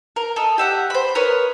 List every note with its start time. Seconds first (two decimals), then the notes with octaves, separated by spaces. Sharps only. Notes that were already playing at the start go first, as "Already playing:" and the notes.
0.16 A#4
0.36 A4 D#5
0.58 G4 E5 F#5
0.90 C5 B5
1.15 A#4 B4 C#5 D#5